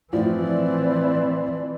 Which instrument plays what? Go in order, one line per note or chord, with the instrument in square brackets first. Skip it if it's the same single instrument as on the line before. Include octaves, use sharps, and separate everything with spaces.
[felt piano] A2 F3 [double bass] E3 C4 [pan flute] D5